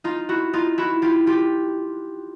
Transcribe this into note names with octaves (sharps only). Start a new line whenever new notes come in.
D#4 F4
E4 F#4
D#4 F4
E4 F#4
F4 G4
F4 G4